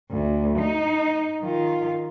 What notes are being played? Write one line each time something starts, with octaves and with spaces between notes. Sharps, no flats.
D2
D#4
D#3 F4